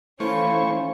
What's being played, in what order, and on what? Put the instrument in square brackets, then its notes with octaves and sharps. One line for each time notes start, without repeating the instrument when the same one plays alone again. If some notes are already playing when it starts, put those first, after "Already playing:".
[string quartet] E3 C#4 [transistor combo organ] A3 C5 C#6 [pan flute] E4 [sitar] F4